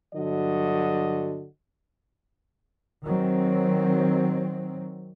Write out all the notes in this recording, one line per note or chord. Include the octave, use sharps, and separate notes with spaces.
G2 D3 F#3 F#4 D#5
D#3 F#3 C4